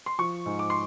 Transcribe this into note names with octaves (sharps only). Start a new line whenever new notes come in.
C6
F3 C#6
G#2
D6
C6